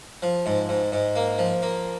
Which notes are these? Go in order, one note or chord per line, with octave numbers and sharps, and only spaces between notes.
F3
G#2
G#2
G#2
A#3
F3
A#3